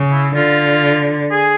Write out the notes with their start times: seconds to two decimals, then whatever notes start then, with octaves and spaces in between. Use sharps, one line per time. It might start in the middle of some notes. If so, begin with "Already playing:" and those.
Already playing: C#3
0.12 E4
0.35 D3 F4
1.32 G#4